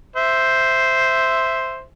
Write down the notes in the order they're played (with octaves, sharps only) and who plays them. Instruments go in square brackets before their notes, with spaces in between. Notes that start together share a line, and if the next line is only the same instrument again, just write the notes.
[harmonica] C5 E5